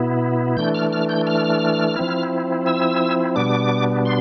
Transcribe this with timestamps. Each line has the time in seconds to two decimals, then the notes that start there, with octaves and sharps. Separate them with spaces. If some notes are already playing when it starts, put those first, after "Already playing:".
Already playing: B2 B3 E4
0.57 E3 A3 D4 G6
0.75 F6
0.92 F6
1.09 G6
1.27 F6
1.96 F3 C4 E4
2.66 E6
3.36 B2 G3 B3 D4 D6
4.05 C6